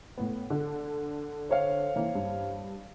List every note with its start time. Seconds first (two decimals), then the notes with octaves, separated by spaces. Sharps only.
0.18 A2 B3
0.50 D3
1.49 C5 C#5 F5
1.96 E3 A#3
2.15 G2